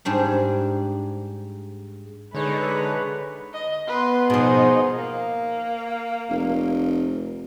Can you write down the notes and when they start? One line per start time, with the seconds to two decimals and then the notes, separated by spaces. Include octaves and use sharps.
0.05 G#2 G3 D4 G#4
2.34 D3 G#3 D#4 B4 C#5
3.54 D#5
3.87 B3 B4 C6
4.30 B2 F3 D#4 G#4
4.96 A#3
6.29 F1